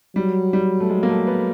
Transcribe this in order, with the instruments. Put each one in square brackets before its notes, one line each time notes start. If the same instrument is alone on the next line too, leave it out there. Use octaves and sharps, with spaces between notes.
[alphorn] F#3 [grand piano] G3
[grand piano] G3
A3
G#3
A#3
A3
B3